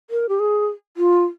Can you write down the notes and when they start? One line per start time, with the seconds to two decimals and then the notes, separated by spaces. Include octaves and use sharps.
0.10 A#4
0.29 G4
0.40 G#4
0.97 F4